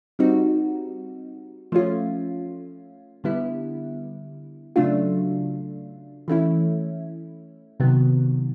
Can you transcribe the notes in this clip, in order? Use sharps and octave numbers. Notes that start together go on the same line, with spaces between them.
G3 C4 D#4 F#4
F3 A3 C#4 F4
D3 G3 B3 E4
C#3 F#3 A3 D4 F4
E3 A3 C#4 E4
C3 D#3 F#3 B3